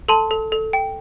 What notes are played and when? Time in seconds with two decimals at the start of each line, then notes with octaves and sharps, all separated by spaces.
0.08 A4 A5 C6
0.31 A4
0.52 A4
0.73 G5